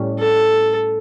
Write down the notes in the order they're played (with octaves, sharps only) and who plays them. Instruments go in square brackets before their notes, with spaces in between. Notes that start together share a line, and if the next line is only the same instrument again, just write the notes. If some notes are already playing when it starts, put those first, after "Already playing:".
Already playing: [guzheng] A2 G3 C#4
[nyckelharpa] A4